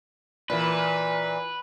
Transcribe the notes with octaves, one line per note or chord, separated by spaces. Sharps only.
A#2 E3 B4